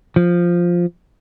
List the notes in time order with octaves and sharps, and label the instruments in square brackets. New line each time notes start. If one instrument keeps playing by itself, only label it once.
[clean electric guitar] F3